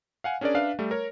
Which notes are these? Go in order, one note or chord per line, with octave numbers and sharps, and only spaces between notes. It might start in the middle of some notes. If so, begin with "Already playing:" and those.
F5 F#5 G#5
C#4 D4 G#4 A#4 D5
D4 B4 E5 F5
G3 A3
A#4 C#5